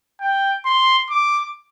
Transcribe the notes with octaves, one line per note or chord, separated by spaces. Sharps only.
G5
C6
D6